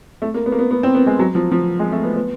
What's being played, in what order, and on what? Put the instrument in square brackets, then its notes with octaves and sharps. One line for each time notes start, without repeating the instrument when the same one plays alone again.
[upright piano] A3
A#3
B3
A#3
B3
B3
C4
B3
G#3
F#3
F3
F3
G#3
A3
B3
B3